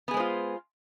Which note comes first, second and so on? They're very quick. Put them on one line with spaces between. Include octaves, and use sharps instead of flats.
B3 G#4 G#3 C5 F4